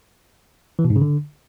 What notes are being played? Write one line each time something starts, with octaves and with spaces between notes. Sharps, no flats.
E3
B2
G#2
C#3
D3